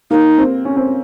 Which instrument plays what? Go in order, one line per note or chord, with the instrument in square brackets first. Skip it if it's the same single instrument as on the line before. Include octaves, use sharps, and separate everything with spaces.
[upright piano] A#3 [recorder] D#4
[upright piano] C4
C#4
C4